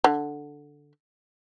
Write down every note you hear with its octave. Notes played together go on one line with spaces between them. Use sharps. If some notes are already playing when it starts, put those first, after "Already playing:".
D3